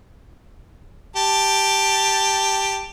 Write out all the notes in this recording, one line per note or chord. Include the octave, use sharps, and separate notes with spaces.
G4 A5